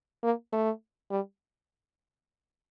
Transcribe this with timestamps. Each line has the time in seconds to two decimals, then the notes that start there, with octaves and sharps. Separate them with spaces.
0.23 A#3
0.53 A3
1.11 G3